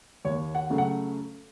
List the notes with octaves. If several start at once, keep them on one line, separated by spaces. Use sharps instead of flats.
D#2 C#5
F#5
C#3 F#3 A3
F#5